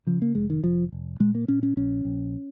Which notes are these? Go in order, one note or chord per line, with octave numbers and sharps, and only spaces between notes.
C#3 F3
A#3
F1 G#3
D#3
F1 F3
F1
A#2 G#3
A#3
A#2 C#4
C#4
A#1 C#4
A#1